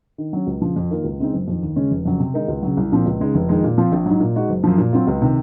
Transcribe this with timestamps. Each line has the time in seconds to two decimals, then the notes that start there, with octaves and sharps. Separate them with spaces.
0.18 D#3
0.33 F#3 C#4
0.47 C#2
0.62 C#3 F3
0.76 F2
0.91 D#3 A#3 F4 A#4
1.04 C#2
1.19 C#3 G#3 C4 D#4
1.33 F#1
1.48 F2 D#3
1.62 D#2
1.76 C#3 G#3 C#4
1.91 F1
2.05 F2 C#3 F#3
2.20 C3
2.34 D#3 G#3 D#4 A#4
2.48 C#2
2.63 C#3 F#3
2.77 C2
2.92 A#2 F3 C4
3.06 C#2
3.20 C#3 G#3 D#4
3.35 F1
3.49 F2 D#3 G#3 D#4
3.64 A#2
3.78 F3 C4 F4
3.92 A#1
4.06 G#2 F#3
4.20 A#2
4.36 G#3 D#4 F#4
4.49 F#1
4.64 F#2 F3
4.78 A#2
4.93 F#3 C4 F4
5.07 C#2
5.22 C3 D#3